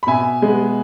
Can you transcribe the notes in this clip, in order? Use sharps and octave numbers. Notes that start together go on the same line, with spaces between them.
B5
B2 E5 G#5
G#3 B3